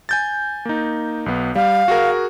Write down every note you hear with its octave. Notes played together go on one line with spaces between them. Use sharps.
G#5 G6 A6
A#3 D#4
B1 B3
G3 F5
F#4 G#4 A#4